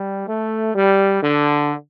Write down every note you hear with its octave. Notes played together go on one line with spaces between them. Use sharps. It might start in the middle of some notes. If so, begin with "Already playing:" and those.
Already playing: G3
A3
G3
D3